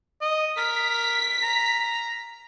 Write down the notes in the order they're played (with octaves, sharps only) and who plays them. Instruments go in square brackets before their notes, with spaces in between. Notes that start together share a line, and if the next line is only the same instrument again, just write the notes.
[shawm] D#5
[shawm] A#4 [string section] B6
[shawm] A#5